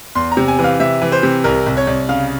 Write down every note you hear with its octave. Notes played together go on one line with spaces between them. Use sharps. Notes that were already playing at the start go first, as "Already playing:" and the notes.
E2 C6
A#5
C3
G#5
E3
F5
C3 E5
E3
C5
C3
C2 A#4
C2
C#5
C2
C#3 F5